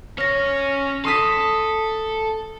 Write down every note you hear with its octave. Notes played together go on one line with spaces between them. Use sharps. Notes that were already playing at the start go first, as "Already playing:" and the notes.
C#4 C#5 F6 A#6
A4 C6 D#6 B6